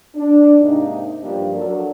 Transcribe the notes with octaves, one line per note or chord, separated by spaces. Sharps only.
D4
G#2 C3 A#3 D#4
G2 F3 A#3 D4 G4
F#3 D4 F#4 A4 A#4 D5